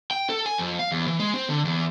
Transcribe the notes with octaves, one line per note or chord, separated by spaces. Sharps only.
G5
A4
G#5
F2
F5
E2
E3
G#3
C4
D3
E2